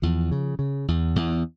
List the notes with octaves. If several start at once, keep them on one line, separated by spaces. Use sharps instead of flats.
E2 F3
C#3
C#3
E2
E2